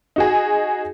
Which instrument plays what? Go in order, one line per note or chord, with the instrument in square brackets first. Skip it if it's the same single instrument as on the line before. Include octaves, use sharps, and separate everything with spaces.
[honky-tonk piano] D#4 F#4 G#4